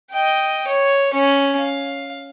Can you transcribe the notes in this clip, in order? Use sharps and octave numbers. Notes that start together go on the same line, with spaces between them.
D#5 G5
C#5
C#4
F5